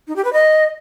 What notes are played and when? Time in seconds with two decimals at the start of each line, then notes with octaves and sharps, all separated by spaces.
0.07 D#4
0.16 G4
0.24 B4
0.33 D#5